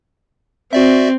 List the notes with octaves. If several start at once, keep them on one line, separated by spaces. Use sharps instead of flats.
C4 F#4 D5 E5